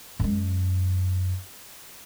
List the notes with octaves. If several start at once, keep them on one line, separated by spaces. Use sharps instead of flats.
F#2 G#3